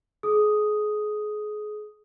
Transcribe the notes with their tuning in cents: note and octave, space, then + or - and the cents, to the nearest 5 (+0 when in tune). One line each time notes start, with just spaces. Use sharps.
G#4 +30 D#6 +0